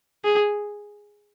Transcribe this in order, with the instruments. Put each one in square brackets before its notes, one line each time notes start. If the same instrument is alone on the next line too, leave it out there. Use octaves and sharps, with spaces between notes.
[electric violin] G#4